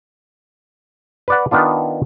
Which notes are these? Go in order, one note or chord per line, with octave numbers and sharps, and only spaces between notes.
B4 D5 F#5
D#3 B3 D4 F4